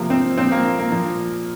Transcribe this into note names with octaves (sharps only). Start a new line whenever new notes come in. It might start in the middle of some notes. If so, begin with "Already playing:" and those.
Already playing: C3 F3 A#3
C4
A#2 F3 C4
A#3
A#3
A#2 F3